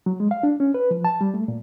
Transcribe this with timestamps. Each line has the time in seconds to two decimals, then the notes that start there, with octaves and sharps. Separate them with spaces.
0.06 F#3
0.20 G#3
0.31 F5
0.43 D4
0.60 C#4
0.74 B4
0.91 F3
1.05 A5
1.21 G3
1.34 A3
1.48 A#2